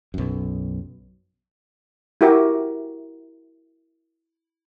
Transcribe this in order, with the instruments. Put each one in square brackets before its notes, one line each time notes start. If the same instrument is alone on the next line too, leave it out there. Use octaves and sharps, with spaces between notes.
[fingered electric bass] B1 F#2
[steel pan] E4 F#4 G4 A#4 E5